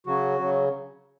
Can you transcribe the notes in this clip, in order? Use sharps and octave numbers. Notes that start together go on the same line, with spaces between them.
C#3 F#3 F#4
C#3 F#3